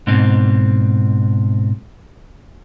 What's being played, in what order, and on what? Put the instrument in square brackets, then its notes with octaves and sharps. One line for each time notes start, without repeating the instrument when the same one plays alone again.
[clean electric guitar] G#2 B2 C4